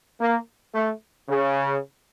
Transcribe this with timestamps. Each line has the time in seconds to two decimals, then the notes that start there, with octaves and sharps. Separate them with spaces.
0.20 A#3
0.74 A3
1.29 C#3